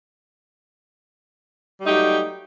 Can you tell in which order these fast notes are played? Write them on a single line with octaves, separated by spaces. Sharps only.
G3 A3 D#4 G4 F#3